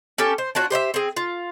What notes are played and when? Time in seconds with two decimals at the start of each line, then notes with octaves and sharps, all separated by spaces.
0.18 C#4 G4 A4
0.38 C5
0.55 D4 F4 F#4 C#5
0.71 G4 C5 D#5 E5
0.94 C4 G#4
1.16 F4